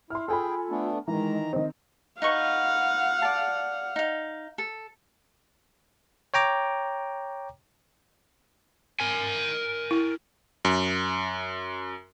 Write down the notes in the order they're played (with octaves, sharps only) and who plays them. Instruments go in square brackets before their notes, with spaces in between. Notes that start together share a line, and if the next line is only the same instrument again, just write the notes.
[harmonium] E4 [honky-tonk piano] C6 F6
[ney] F4 [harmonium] G#4 G5 [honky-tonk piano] A4 G#5 B5
[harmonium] A3 B3 D4
[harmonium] D#3 A#5 [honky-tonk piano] E3 [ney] G#3
[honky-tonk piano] D#3 C4 [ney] D#5
[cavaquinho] D#4 B4 C#6 [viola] F5 F#5
[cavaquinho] D5 A5
D#4 F5
A4
[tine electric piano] C#5 G5 A#5 D6
[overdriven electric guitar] A#4 G#5
[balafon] E4
[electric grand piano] F#2